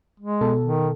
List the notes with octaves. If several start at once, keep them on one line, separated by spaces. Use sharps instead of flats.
G#3
B2 A4
D#3